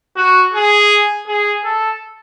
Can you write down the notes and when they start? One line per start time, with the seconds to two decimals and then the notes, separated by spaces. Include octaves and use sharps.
0.16 F#4
0.53 G#4
1.27 G#4
1.64 A4